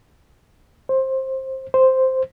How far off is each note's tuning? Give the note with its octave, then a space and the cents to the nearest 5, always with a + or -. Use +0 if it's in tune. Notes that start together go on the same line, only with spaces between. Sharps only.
C5 +20
C5 +0